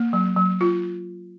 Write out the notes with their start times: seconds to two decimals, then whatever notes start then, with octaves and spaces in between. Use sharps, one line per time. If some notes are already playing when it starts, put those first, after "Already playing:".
Already playing: A#3
0.13 F#3
0.36 F#3
0.61 F4